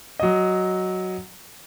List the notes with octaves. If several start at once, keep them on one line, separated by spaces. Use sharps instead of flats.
F#3 D#5